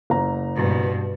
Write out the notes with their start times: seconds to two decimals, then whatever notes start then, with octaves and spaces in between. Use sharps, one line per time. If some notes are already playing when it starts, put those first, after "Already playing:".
0.10 F#1 A#5
0.56 G2 B2